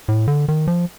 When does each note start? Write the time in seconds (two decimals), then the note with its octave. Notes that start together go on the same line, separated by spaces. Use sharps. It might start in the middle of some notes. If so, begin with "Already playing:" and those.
0.08 A2
0.28 D3
0.48 D#3
0.67 F3